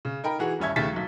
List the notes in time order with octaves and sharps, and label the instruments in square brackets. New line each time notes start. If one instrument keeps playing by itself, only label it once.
[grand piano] C#3
D#4 A#4 G5 B5
E3 F#4 G#4
D#1 G2 C#4 E5 G#6
D#2 C#3 A3 A6 B6
B1 F#3